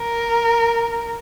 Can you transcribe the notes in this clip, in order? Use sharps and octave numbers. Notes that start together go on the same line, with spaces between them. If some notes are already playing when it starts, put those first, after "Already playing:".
Already playing: A#4